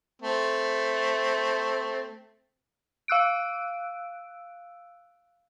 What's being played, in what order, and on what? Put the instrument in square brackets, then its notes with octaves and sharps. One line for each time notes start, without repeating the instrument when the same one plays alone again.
[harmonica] A3 C4
[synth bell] F5 E6 F#6 D7